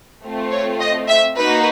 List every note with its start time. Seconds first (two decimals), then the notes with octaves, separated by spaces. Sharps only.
0.23 A3 C4 F4
0.51 C#5
0.80 D#5
1.09 E5
1.37 A#3 D#4 F#4 B4